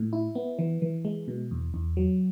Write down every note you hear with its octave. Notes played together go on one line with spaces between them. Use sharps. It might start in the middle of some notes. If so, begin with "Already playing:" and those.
Already playing: A2
E4
B3
E3
E3
G#3
B2
E2
E2
F#3